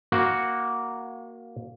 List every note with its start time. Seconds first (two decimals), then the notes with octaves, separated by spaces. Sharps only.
0.12 A#3 F#4 F#5